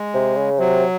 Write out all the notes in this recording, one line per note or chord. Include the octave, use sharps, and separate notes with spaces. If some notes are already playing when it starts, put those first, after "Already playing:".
Already playing: G#3
C3
C#3
C3 F#3